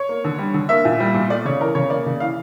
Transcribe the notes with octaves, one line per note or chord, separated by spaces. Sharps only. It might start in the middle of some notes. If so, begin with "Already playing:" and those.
Already playing: C#5
A#3
D3
G3
D3
A#3 E5
A#2
G3
A#2
A3 D5
C#3 C#5
E3 A#4
C#3 C#5
A#3 D5
C#3
E3 F5